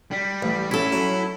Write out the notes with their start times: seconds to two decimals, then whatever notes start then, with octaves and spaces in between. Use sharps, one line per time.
0.11 G3
0.43 A1
0.71 C#4 E4 F#4 A4
0.92 F#3